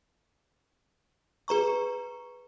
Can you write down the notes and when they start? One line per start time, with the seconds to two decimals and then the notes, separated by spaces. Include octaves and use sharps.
1.48 G#4 B4 A#5 C#6